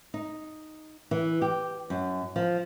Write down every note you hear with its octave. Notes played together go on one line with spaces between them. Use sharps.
D#4
E3
G4
F#2
F3